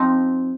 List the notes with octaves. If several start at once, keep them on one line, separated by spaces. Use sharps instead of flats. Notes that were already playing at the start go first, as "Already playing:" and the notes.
Already playing: F3 C4 D#4